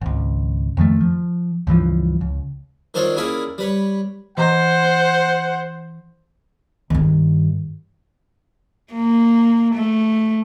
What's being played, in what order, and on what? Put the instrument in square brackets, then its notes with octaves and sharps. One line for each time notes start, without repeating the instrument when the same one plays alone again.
[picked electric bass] G#1 C#2
F2 D#3 F3 A3
F3
C#2 G2 E3 F3
C#2
[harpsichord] D#3 C4 D4 F4 C5 C#5
A#3 C#4 E4 G#4 D5
G3 B4 C#5
[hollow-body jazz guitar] E3 D#5 A#5 [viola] C5 [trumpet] F#5
[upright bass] G2 D#3
[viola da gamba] A#3
A3